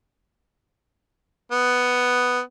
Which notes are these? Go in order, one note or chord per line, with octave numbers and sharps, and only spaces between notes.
B3